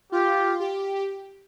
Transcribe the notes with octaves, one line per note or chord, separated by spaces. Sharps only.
F4 G4
G4